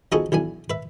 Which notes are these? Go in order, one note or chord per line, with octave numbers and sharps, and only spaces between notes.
F3 B3 D#4 F#4 G#4 A4
B1 E3 D4 G#5
B4 E5